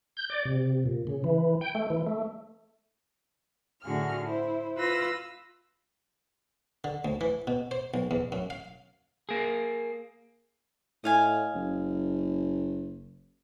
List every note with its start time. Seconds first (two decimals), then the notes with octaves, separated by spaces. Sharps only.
0.17 G6
0.30 D5
0.45 C3
0.86 A#2
1.07 C#3
1.24 E3
1.61 G5
1.75 A3
1.90 E3
2.06 A3
3.83 A2 D3 F#4 G#4 F6
4.22 E4 C5
4.76 F4 B4 E6 A#6
6.84 D3
7.05 D2
7.21 E3
7.47 B2
7.71 C5
7.94 B1
8.11 E2
8.32 F#2
8.50 F5
9.29 A#3 G#4
11.04 A2 D#5 F5 G#5
11.55 F#1